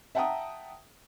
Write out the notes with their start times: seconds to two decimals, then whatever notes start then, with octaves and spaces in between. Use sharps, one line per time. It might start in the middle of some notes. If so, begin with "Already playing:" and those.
0.15 E5 F#5 G5 A5 A#5 D#6